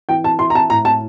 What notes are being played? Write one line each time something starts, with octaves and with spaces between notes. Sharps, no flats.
E3 G5
A5
E4 C6
A#5
A5
A2 A#5
A5